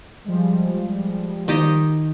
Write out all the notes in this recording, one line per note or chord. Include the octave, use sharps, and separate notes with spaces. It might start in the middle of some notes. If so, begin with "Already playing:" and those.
F3 G3 G#3
D#3 G4 D#5